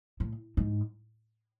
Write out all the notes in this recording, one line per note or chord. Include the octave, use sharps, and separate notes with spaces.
A2
G#2